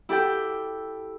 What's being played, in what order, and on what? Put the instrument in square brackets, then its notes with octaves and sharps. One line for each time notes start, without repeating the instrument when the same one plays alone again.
[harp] E4 G4 A4 G5